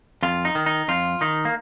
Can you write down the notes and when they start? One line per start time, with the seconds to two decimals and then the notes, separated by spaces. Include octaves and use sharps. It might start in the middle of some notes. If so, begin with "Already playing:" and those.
0.23 F2 F4
0.45 D#4
0.55 D#3
0.66 D#4
0.88 F2 F4
1.21 D#3 D#4
1.45 A#3